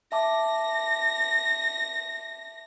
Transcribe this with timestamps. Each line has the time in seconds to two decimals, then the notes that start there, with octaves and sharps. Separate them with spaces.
0.12 E5 A5 D6 A#6